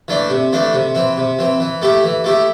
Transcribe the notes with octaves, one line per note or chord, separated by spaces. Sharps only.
E3 A3 D4
C3
E3 A3 D4
C3
E3 C4
C3
E3 C4
E3
A3 E4 G4
E3
A3 E4 G4